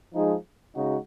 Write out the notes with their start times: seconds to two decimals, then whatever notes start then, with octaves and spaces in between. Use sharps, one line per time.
0.13 F3 G#3 D#4 G#4
0.75 C#3 G#3 D#4 F#4